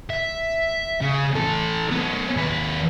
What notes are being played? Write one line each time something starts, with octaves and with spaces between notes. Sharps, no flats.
E5
C#3
E3 A4
B3 C#4
D#2 B4